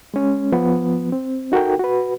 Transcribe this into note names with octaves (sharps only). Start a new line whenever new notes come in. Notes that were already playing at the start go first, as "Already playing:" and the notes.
G#3 C#4
F3 B3
C4
D#4 F#4 A4 A#4 G5
F#4 B4